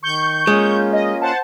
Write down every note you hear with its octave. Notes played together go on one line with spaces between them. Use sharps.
D#3 C#6 G6
G#3 A#3 C#4 F4
D#5
C5 F#5 A5